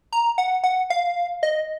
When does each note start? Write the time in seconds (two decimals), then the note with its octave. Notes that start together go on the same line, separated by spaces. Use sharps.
0.13 A#5
0.38 F#5
0.64 F#5
0.90 F5
1.43 D#5